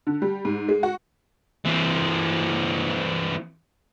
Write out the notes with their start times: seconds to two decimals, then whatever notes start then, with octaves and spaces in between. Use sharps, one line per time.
0.07 D3
0.22 G3
0.45 G#2
0.69 G#3
0.83 F#4
1.65 E3 C4